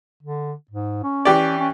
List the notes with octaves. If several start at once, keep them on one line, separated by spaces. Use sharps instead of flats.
D3
G#2
C#4
E3 G4 D5
C#4